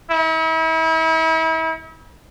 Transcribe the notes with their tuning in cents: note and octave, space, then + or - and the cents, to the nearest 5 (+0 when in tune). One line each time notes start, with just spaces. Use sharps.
E4 -40